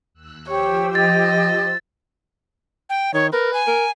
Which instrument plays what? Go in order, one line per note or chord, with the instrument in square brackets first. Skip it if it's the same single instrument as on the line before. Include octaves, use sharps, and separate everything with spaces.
[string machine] D#2 E6 F#6
[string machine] F3 C5 E6 [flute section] G4 [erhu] C#5
[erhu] D#5 [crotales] A6
[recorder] G5
[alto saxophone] D#3 [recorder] C#5
[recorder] A#4 [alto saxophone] B4
[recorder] G#5
[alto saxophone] A#4